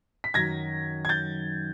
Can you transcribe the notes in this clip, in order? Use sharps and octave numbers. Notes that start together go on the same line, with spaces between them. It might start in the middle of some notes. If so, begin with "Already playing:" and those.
B6
F#2 D#3 F#3 G#6 A#6
G#6
G6 A6